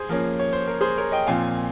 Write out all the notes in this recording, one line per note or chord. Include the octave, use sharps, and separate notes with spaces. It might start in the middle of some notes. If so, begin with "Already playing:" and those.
Already playing: G#4 C5
F3 A#3 C#4
C#5
C5
A#4
G#4 C5
A#4 C#5
D#5 G5
A#2 F3 C4 F5 G#5